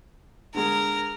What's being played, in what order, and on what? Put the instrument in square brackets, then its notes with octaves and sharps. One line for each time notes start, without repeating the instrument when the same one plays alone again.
[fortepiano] D3 G#3 [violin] A#4